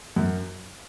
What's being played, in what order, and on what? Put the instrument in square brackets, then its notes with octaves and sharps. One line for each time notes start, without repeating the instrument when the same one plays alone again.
[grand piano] F#2